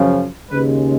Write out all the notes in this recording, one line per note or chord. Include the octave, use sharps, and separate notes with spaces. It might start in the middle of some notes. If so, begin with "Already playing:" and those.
Already playing: F#2 C#3 F3
D#2 C#3 G#3 B4